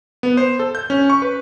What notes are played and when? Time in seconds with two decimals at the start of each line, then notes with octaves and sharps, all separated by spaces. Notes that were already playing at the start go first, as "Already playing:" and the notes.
0.23 B3
0.37 C5
0.59 A4
0.75 G6
0.90 C#4
1.10 C#6
1.22 B4